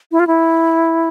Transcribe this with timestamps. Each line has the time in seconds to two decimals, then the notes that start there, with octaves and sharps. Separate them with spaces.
0.12 E4
0.20 F4
0.27 E4